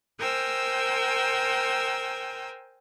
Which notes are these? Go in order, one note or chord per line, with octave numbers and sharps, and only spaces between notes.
A#4 C5 G5 G#5 E6